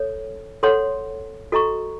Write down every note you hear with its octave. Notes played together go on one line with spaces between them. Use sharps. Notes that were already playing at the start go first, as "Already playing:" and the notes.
Already playing: A4 C#5
A4 C#5 F#5 C6
F#4 A4 D#5 A#5 C#6